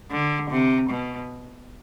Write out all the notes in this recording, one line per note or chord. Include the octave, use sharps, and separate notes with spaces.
D3
C3
B2